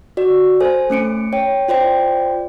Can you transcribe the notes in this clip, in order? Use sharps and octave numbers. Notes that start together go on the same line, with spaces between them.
F#4 D5
A4 C5 G#5
A3 C#4 C#7 D7
C#5 G5
F4 C5 D5 G5